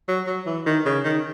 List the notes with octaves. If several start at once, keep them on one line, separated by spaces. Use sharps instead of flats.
F#3
F#3
E3
D#3
C#3
D#3